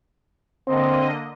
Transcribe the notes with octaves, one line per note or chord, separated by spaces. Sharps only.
D3 A#3 C4 D#5